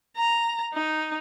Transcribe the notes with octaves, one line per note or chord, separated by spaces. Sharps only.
A#5
D#4